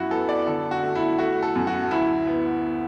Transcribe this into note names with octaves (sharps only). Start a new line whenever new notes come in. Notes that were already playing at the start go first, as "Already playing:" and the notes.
Already playing: F#2 E4 F#4
B3 A4
D5
D3 A4
F#4
A3
E4
A3 F#4
A4
F#2
F#4
D2 E4
B3